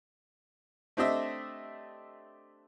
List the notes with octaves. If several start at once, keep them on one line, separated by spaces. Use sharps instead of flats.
A3 C4 D4 G4 D#5 E5